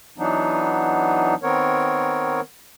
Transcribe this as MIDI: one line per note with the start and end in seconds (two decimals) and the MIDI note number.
0.18 1.35 52
0.18 1.35 54
0.18 1.35 59
0.18 1.35 62
0.18 1.35 63
1.43 2.41 51
1.43 2.41 59
1.43 2.41 60
1.43 2.41 70
1.43 2.41 73